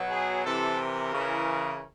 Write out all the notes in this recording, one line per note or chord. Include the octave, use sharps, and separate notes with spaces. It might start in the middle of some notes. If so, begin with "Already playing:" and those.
Already playing: B2 F#3
G#4
C3 E3 A4
A#4
C#3 E3